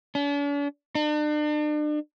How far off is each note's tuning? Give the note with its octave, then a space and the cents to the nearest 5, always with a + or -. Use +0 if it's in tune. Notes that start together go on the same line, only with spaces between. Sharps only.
D4 -45
D4 +40